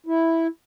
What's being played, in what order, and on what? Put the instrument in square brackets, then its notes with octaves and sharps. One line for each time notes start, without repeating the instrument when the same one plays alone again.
[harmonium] E4